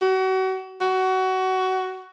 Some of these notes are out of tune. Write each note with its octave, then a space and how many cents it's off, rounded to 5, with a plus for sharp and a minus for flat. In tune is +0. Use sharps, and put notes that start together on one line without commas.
F#4 +35
F#4 +20